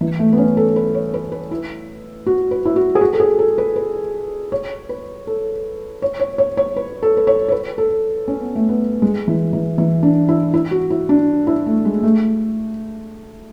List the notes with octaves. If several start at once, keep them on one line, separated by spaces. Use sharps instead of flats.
E3
A3
B3
C#4
A4
B4
C#5
B4
B4
E4
F#4
B4
E4
F#4
G#4
F#4
A4
G#4
A4
B4
B4
C#5
B4
A4
C#5
C#5
C#5
C#5
B4
A4
B4
C#5
C#5
B4
A4
C#4
B3
A3
B3
G#3
E3
E3
E3
D4
E4
E4
F#4
E4
D4
E4
A3
G#3
A3